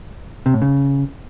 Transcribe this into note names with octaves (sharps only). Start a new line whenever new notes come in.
C3
A2
C#3